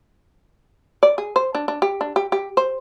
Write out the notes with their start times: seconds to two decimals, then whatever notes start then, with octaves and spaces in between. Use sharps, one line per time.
1.03 D5
1.18 G#4
1.36 C5
1.55 D4
1.68 D4
1.82 G4
2.01 D4
2.16 G4
2.32 G4
2.57 C5